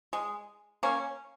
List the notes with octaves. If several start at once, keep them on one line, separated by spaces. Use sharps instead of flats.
G#3
A#3 C#4